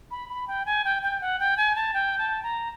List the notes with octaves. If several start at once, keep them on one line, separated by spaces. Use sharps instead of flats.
B5
B5
G5
G#5
G5
G5
F#5
G5
G#5
A5
G5
A5
A#5